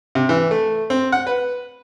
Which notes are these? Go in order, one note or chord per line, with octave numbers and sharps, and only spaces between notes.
C3
E3
A3
C4
F#5
B4